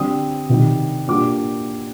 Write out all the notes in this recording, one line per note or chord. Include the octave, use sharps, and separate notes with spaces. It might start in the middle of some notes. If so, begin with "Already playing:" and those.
Already playing: D3 G3 C4 D#6
C3 D#3 G3
A#2 G3 D4 D6